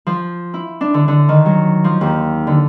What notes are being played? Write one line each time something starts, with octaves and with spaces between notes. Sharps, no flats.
F3
E4
D4
D3
D3
D#3
F#3
F3
D#2
D3